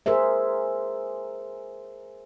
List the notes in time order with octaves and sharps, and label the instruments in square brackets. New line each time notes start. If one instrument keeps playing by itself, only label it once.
[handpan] G#4 A#4 C5 E5